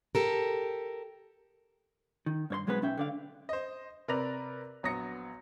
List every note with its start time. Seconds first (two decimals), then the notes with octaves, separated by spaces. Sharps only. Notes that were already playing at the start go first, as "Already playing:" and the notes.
0.15 G4 A4 A#4
2.26 D#3
2.50 G2 C#5 C6
2.67 B1 F#3 G#3 B3 C4 B4
2.82 B1 C#4 E5 G5
2.98 D3 D5 F5
3.49 C5 D#5
4.08 C3 A#4 B4 D5 A#6 F7
4.83 A#1 F#3 B3 D#6 A#6 C#7